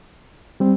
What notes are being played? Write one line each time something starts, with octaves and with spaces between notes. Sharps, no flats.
G3 C4